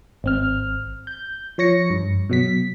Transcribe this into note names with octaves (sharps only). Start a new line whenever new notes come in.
G#1 C4 F6
G6
F3 C#5 A#6 C#7
G2
B2 F#3 B6